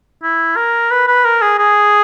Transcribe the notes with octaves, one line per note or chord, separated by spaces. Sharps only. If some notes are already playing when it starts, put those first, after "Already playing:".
E4
A#4
B4
B4
A#4
G#4
G#4